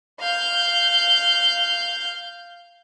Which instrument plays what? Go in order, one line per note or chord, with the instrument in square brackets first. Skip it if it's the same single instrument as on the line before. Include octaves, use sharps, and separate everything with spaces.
[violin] F5 G6